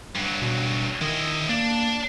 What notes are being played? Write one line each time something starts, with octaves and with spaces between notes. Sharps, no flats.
G2 F#3
B2
D#3 E4 D#5
A#3 D4